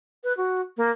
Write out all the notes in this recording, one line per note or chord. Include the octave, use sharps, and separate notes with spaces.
B4
F#4
A#3